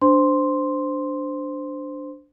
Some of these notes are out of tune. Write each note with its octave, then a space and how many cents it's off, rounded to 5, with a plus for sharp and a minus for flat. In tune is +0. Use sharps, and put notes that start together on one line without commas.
D4 +0 C5 -15 C6 +0